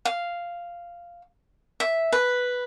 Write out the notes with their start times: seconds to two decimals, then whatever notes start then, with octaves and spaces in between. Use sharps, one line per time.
0.05 F5
1.80 E5
2.12 B4